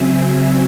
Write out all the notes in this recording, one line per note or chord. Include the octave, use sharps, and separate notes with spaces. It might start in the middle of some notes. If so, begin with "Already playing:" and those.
Already playing: C#3 F#3 C4 E5 G#5